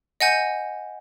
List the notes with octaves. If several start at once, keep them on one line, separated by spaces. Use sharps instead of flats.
D#5 F#5 G#5 G6